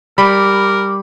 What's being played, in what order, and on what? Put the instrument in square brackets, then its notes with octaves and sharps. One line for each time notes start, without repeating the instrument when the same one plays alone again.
[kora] G3 [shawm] A#4 [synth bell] B5 [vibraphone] D6